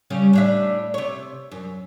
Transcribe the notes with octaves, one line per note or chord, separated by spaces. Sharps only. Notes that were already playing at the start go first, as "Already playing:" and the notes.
C#3 G3 C#4
A2 D4 E5
C3 C#5
F#2